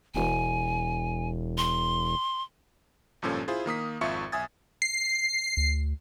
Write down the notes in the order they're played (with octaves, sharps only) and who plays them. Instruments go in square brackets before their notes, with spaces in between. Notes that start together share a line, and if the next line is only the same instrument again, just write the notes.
[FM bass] E1 [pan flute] G#5
[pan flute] C6
[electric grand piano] G#1 G2 A#2 F3 C#4 A4
E4 F4 G#4 C5
D#3 A#3 D#6 B6
G#1 F2 F4 E5 C#6 C#7
B1 E5 G#5 D#6 G#6 A6
[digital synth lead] C7
[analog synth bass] D2